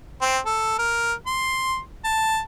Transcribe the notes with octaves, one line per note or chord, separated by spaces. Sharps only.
C4
A4
A#4
C6
A5